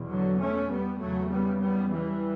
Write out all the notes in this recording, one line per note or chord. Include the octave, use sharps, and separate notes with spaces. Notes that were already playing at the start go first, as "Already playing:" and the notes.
Already playing: E2 B2
D3 F#3
A3 C#4
G3 B3
E2 C#3 F#3 A3
G3 B3
G3 B3
E3 G3